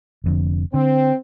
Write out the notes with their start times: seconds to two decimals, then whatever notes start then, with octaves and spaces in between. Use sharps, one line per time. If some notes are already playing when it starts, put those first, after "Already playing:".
0.24 F1 F2 D3
0.74 D3 C4